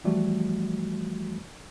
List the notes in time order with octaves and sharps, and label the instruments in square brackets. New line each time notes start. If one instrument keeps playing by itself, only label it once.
[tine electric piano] E3 F3 G3 A3 F#4